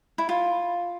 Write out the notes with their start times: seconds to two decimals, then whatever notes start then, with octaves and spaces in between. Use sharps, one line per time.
0.18 E4
0.29 F4